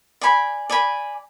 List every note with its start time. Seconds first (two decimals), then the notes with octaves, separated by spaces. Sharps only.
0.21 D5 G#5 B5
0.70 D5 G#5 B5